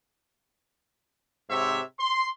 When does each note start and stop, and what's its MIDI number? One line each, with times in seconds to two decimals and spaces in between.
1.49 1.79 44
1.49 1.79 48
1.49 1.79 73
1.49 1.79 76
1.98 2.26 84